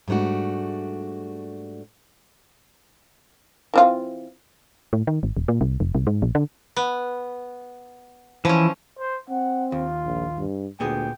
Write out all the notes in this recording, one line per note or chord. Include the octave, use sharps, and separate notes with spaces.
G#2 G3 A3 D4 F#4
E3 C4 F4
A2
D#3
G#1
D#1
A#2
C2
F1
C2
G#2
A#1
D3
B3
E3 F3 C#4
C5
C4 F#5
D#2 F4
A#1
G2
D2 A#2 B3 G#4 G5